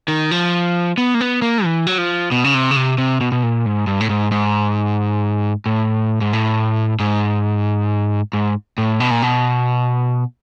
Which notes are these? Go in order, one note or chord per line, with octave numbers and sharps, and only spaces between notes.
D#3
F3
B3
A#3
B3
A#3
E3
F#3
F3
B2
C#3
C3
C#3
C3
C3
B2
B2
A#2
G#2
G2
A2
G#2
G#2
A2
G#2
A2
G#2
G#2
A2
B2
A#2
B2